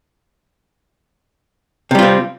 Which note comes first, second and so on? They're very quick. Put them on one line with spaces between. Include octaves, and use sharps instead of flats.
C3 G3 F4 C4